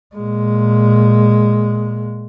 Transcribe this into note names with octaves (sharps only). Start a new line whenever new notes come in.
A#2 G#3